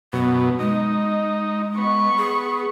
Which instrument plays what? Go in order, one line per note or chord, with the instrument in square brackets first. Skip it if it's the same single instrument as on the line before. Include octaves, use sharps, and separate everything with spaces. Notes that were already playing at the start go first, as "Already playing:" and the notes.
[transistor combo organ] F#2 B2 [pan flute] B3
[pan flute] G#3 [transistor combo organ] D#4
[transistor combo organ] B3 [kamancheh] C#6
[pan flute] G#4